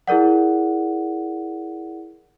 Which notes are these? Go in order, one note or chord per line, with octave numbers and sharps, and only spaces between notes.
E4 G#4 A#4 D5 F#5